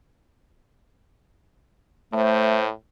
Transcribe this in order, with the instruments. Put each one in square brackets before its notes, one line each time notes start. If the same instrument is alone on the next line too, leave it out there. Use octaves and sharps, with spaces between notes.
[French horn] A2 [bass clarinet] A3 [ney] C5